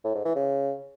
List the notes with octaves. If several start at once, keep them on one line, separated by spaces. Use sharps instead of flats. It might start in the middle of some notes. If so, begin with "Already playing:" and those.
A2
G#2
E3
C#3